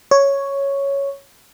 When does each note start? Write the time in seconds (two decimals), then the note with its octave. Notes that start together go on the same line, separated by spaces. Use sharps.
0.11 C#5